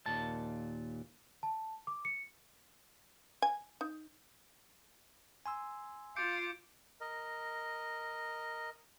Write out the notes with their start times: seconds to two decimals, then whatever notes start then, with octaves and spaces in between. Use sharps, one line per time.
0.06 D#2 A#2 A5
1.43 A5
1.87 D6
2.05 C#7
3.42 G#5
3.81 D#4
5.46 G#5 C6 E6
6.16 F4 D6 G6 C#7 D7
7.01 A#4 D#5